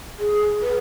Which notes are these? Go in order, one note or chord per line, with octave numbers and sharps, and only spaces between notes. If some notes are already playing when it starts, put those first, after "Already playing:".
G#4
B4